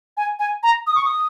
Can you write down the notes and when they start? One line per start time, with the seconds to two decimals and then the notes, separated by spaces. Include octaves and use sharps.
0.17 G#5
0.39 G#5
0.63 A#5
0.87 D#6
0.95 C#6
1.05 D#6